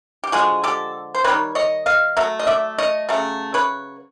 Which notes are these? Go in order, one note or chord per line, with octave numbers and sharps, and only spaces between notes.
G4
D3 F3 G#3 F#4 G#4
G4 A4
C5
D#3 G3 C4 B4 C#5
C#5 D#5
D#5 F5
F#3 A3 E5
D#5
D5 E5
C#5 D#5
C#3 F#3 A3
B4 C#5